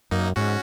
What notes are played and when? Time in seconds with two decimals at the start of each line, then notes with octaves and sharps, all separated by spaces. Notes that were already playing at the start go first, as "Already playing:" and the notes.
0.11 F#2 A#3 D#4
0.36 G#2 C#4 F#4